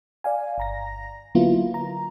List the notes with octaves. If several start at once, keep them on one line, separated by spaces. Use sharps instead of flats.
D5 F5 G#5
G1 A#5 A#6
D3 F#3 A#3 B3 E4 F4
A#5